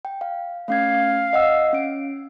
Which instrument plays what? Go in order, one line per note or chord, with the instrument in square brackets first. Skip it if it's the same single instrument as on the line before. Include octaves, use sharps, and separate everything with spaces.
[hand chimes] G5
F5
[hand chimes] A3 C#4 G#6 [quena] F5
[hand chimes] D#5 F#5 E6
C#4 D7